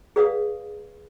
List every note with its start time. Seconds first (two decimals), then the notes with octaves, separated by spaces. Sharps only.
0.16 G#4 B4 D5 F5 F#5 D#6